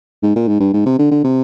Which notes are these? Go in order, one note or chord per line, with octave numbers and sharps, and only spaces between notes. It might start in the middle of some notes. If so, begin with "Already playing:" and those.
G#2
A#2
G#2
G2
G#2
C3
D3
D3
C3